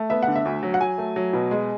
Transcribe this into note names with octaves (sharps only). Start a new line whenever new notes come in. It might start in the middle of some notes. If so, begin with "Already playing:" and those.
Already playing: A3
B3 E5
D3 F#5
E5
D2
F#3
F#5
F#3 G#5
A3
F#3
B2
G#3